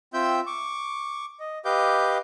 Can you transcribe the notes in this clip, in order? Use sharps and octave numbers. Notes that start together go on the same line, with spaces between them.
C4 F4 E5 G5 E6 G6
C#6 D6
D#5
G4 B4 D#5 F5 D6 G6